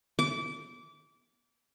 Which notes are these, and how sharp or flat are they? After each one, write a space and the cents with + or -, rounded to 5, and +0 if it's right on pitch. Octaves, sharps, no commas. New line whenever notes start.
D6 -25